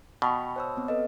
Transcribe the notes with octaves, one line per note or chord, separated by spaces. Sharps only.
B2 G5 B5 C#6
C5 C#5 E6
B3 C4
A4 B4 D#5